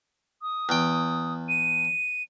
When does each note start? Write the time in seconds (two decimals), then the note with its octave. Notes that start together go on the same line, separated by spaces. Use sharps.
0.42 D#6
0.69 E2 G5
1.49 D#7